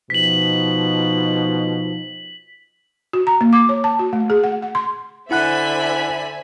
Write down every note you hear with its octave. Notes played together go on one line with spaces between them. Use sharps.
B2 F3 D#4 B6 F#7
F#4
A#5
A#3
D6
C#5
A5
F#4
A3
G#4
F#5
F#5
C6
D3 E4 C5 E5 F#5 G#5 B5 F#6